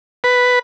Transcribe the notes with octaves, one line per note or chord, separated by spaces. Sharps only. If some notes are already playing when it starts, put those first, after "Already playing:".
B4